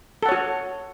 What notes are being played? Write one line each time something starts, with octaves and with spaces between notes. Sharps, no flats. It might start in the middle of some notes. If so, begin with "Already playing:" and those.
F#4 A4 C#5 F#5